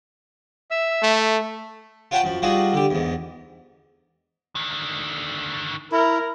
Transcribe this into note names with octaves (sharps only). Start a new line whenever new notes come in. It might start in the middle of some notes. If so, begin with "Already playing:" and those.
E5 E6
A3
F4 C#5 F#5 G5 A5 B5
F#2 F3
F3 G3 D#4 F4 F#4 G#4
D3 G4
E2 G#2
D3 D#3
E4 A#4